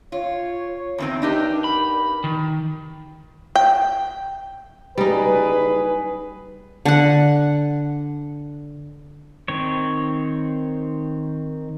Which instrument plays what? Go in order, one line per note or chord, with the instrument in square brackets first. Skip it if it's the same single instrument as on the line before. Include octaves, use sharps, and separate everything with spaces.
[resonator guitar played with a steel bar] F4 [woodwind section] C#5
[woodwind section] C#5
[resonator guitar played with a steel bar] E2 D#3 C4 [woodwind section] C#5
[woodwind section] G2 A#4 [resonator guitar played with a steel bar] D4 D#4 G4
[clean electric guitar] B5
D#3
[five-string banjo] G5
[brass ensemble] F#1 G#4 B4 [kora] G3 D#4
[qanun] D3 F#5
[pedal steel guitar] D#3 C4 C#5